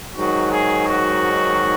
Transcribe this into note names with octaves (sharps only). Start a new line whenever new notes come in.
G#2 D#3 F#3 F#4
G#4
F#4